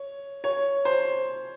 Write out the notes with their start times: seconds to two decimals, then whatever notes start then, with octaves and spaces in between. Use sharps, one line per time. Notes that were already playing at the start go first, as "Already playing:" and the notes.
Already playing: C#5
0.44 C#5
0.85 C5